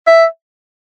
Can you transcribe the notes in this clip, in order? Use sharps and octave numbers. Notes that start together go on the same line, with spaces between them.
E5